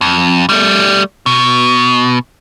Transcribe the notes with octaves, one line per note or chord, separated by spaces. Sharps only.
F2
G3 A3
B2